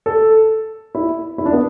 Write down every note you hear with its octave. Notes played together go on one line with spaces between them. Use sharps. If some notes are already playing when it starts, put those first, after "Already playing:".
A4
E4
E4
D4
B3